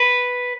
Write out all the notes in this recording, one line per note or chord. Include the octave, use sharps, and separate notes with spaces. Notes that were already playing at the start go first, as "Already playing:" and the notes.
Already playing: B4